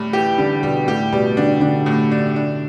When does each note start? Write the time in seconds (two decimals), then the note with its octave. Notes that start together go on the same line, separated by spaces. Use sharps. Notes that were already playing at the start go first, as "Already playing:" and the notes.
Already playing: A2 G3
0.13 E3 G4
0.38 D3 G3
0.63 B2 G3
0.87 A2 G4
1.12 B2 G3
1.37 D3 D4
1.61 D3 D4
1.86 A2
2.11 D4
2.36 D4